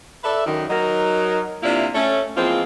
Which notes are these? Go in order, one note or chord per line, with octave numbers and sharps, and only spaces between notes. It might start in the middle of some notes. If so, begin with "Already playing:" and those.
A4 B4 D5 E5
F#2 D#3
F#3 D#4 A#4
C3 A#3 D4 E4 F4
A3 C#4
E3 F3 G#3 A#3 C4 F4